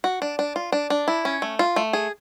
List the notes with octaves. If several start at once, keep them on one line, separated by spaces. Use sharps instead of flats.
F#4
D4
D4
F4
D4
D4
E4
C#4
A3
F4
A3
G#4